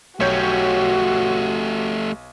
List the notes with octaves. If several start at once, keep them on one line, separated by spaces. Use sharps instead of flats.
B1 A3 F#4 G4 C#5 G6